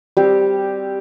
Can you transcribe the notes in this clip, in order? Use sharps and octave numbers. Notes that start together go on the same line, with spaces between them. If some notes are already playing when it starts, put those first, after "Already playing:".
G3 C4 G4